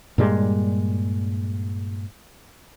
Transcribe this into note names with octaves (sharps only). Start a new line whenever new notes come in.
G2 A#2 G3 G#3